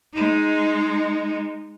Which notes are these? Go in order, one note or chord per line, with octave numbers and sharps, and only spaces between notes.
G#3 D#4